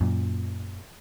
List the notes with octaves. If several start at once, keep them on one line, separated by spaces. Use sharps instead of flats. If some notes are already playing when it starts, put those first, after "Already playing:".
F#2 A#2